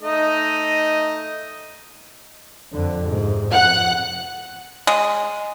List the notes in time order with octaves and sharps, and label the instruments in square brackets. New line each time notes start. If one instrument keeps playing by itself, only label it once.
[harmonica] A3 D#4 D#5
[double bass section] F2 D3
G#2 C3
[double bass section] F2 [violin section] F#5 F#6
[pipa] G#3